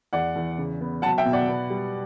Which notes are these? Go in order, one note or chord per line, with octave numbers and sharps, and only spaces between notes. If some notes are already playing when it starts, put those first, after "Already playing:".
E2 D5 F#5
E2
C#3
B3
F#3 F#5 A5
E5 G5
B2
D5 F#5
B3
G3